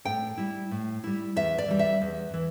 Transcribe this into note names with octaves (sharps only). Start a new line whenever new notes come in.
A2 G5
G3 E4
A2
G3 E4
E2 E5
D5
E3 G3
E5
E2
E3